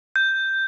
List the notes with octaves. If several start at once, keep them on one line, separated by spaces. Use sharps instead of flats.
G6